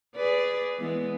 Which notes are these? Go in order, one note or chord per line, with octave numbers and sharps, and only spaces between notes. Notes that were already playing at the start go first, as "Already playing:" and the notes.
G#4 B4 D5
E3 G#3 B3